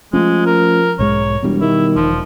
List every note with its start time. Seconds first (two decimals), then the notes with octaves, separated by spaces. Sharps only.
0.14 F3 G#3 A3 C#4
0.46 A#4
0.99 B1 G#2 G#3 C#5
1.43 E1 B2 G3
1.61 D#3 E4
1.96 E1 F3